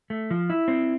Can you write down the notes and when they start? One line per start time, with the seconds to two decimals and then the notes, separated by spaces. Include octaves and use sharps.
0.10 A3
0.31 F3
0.50 E4
0.68 C4